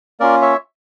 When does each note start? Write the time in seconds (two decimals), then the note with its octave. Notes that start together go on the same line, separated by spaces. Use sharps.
0.20 A#3 C#4 F4 A#4 D5
0.42 C#5 E5